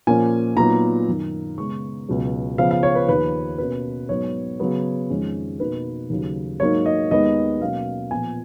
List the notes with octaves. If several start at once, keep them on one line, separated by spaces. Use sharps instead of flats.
A#2 F3 A#3 C#4 G#5
A#2 F#3 B3 D#4 A#5
F#2 D#3 A#3
C#3 G#3 B3 C#6
C#2 B2 F#3
C#3 F3 B3 F5
F5
C#5
B4
D#2 C#3 F3 B4
B2 A#3 C#4 B4
G#2 F#3 B3 C#5
C#3 F#3 B3
F2 D#3 G#3 C#4
B2 A#3 D#4 B4
D#2 C#3 F#3
G#2 F#3 A#3 D#4 C#5
D#5
D#2 D#3 G#3 B3 D#4 D#5
B2 F#3 A#3 C#4 F5
A#2 F3 B3 G#5